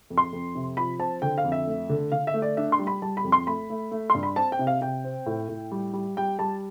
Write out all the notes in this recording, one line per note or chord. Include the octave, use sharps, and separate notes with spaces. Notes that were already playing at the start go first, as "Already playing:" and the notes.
F2
C6
F2
C3
F3 B5
C4 A5
D3 G5
F5
F2
E5
A3
D3
D3 F5
E5
A3
D5
D4 E5
C6
G3
B5
G3 A5
B5
F2
C6
A3 B5
A3
A3
G2 C6
B5
C4 A5
G5
C3
F5
C3 G5
C4
A2
A2
G3
G3
G3 G5
G3 A5